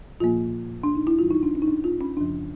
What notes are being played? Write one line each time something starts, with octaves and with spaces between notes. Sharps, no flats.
A#2 F3 A#3 F4
D4
D#4
E4
G#2 E3 G3 F4
D#4
D4
C#4
D#4
D4
F4
C#4
F#2 C#3 F3 D4